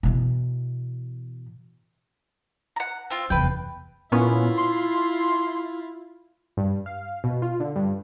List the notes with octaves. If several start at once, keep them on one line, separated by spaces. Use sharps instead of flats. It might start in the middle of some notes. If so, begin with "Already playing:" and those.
B2 E3
F#5 A#5
C4 F4
F1 E2 B4 G5
A#2 B3 C#4 E4 F4
C6
G2
F5
B2
F4
D3
G2